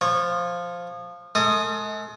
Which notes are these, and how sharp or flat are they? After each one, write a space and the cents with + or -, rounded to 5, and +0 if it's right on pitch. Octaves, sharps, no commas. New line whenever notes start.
F3 +0 C#5 -20
G#3 +40 A4 +45 D#6 +0